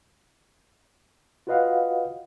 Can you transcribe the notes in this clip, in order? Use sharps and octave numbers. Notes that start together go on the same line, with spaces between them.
F4 F#4 B4 D#5 F5 F#5